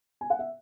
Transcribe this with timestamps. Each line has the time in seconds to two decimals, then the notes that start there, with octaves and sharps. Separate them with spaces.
0.21 G#5
0.30 F#5
0.39 E5